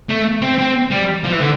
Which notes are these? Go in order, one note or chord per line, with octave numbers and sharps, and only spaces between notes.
A3
C4
C4
G3
F3
E3
D3